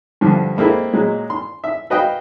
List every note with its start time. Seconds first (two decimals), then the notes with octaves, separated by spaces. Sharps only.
0.21 G2 D3 F3
0.57 G#3 A#3 C4 E4 A4
0.93 A#2 F#3 G#3
1.30 C6
1.64 E5
1.90 F#4 B4 D#5 F5 G5